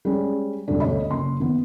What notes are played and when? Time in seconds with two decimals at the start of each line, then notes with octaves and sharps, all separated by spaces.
0.05 G3 G#3 C#4
0.68 E1 D3 G3 D4
0.80 D2 C#5 D#5 B5
1.10 F#1 C6
1.40 D#3 B3